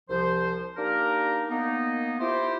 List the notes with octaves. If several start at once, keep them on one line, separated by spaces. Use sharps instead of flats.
C2 F3 C5
A#3 D4 D#4 G4 A#4
A#3 B3 D#4
E4 F4 G4 C5